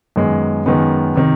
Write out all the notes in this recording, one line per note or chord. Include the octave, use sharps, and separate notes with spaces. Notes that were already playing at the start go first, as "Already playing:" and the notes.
F#2 D#3 G#3 B3
F#2 D#3 G#3 B3
C3 D#3